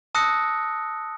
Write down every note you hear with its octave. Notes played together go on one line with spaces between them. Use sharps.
A5 D#6 E6 F#6 A#6 C#7